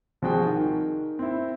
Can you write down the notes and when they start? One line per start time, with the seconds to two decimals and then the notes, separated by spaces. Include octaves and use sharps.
0.22 C2 F3 C4 F#4 G#4 G5
0.45 D#3
1.19 C4 E4